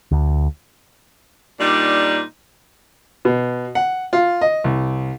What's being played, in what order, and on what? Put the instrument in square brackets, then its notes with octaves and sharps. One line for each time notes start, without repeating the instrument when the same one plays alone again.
[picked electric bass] D2
[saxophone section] A#2 G3 D4 D#4 D5
[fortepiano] B2
F#5
F4
D#5
C2